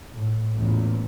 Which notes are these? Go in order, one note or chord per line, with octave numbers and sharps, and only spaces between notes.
A2
A1 E2 A#2